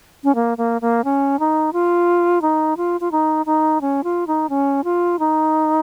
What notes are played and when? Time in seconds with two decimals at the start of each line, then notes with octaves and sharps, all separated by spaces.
0.24 C#4
0.35 A#3
0.58 A#3
0.82 A#3
1.04 C#4
1.40 D#4
1.73 F4
2.42 D#4
2.77 F4
3.01 F4
3.12 D#4
3.46 D#4
3.81 C#4
4.04 F4
4.27 D#4
4.49 C#4
4.84 F4
5.19 D#4